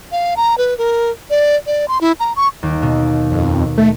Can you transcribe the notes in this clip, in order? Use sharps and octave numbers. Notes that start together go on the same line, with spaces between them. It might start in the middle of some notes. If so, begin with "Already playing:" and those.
F5
A#5
B4
A#4
D5
D5
C6
E4
A#5
C#6
D#2
B2
F2
A3